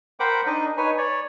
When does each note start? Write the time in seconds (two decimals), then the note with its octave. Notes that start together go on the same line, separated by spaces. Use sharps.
0.20 A#4 C5 F#5 G5 B5 D6
0.46 D4 D#4 D#5
0.77 D#4 B4 C#5 G#5
0.98 C#5 D5